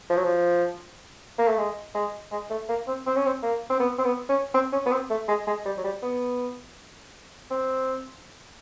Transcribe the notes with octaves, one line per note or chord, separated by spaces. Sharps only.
F3
F#3
F3
A#3
A3
G#3
G#3
G#3
A3
A#3
C4
C4
C#4
C4
A#3
C4
B3
C4
B3
C#4
C4
C#4
B3
C4
A3
G#3
G#3
G3
F#3
G3
B3
C4